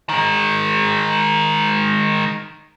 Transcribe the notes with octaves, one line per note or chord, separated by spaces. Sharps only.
D#3 G#3